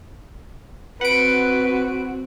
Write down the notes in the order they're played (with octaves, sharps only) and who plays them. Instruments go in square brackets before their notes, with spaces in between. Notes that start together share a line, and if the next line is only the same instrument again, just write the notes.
[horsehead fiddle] C4 F#4 [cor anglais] B4 [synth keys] F#5 D7